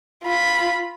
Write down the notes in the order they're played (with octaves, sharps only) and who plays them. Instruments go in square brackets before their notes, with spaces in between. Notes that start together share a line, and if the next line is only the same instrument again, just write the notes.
[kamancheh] F4 B5